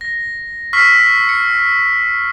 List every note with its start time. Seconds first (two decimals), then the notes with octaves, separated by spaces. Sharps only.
0.01 A#6
0.73 C#6 E6 F6 B6 C7
1.29 C#7